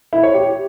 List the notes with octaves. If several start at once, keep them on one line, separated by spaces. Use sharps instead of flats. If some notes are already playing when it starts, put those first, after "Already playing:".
E4
C#5
G4